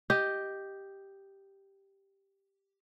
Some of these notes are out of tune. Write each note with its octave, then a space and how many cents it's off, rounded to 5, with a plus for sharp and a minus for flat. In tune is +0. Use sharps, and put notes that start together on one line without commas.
G4 +0 D#5 +0